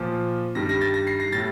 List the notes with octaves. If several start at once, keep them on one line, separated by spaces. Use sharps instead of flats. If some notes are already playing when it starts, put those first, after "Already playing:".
Already playing: A#2 F3
G2 D#3 G3 A#6
A#6
A6
A#6
C7
A#6
A2 G3 A6